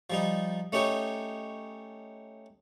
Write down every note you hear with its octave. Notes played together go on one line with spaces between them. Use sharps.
F3 G3 D#4
A3 C#4 D#4 G4 C#5